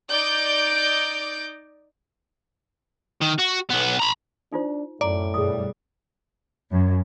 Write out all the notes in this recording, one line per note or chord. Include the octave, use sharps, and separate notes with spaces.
D#4 D5 D6 G6 D7
D#3
F#4
B1 B3
A#5 B5
D4 D#4 F4 C5
F#2 A2 D5 A#5
G2 B2 G3 G#4 D#6
F#2